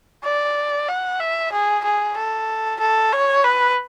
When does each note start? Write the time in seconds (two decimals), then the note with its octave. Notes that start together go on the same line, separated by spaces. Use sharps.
0.25 D5
0.89 F#5
1.20 E5
1.53 G#4
1.84 G#4
2.17 A4
2.80 A4
3.13 C#5
3.44 B4